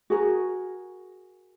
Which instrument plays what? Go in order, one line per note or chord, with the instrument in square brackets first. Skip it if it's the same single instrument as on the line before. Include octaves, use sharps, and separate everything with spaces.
[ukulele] F#4 G#4 A#4